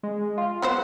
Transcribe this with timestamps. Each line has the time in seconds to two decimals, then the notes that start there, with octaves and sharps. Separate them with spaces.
0.03 G#3
0.37 F4
0.62 F#3 B3 C5 F#5